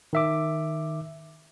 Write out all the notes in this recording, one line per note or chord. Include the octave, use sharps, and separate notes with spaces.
D#3 E5 D6